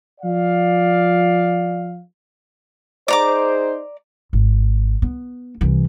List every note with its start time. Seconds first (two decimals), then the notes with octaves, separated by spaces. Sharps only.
0.21 F3 D5 F5
3.08 D#4 G#4 C5 D5 A#5 D6
4.33 G#1
5.02 B3
5.61 C2 E3